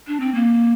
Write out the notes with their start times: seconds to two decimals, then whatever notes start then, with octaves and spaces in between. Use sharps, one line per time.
0.07 D4
0.20 C4
0.34 A#3